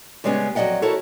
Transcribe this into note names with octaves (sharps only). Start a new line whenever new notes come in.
C#3 G3 G#3 A#3 B3 C#4
F2 F#3 D5 D#5 F#5 G5
E4 F#4 A4 A#4 C#5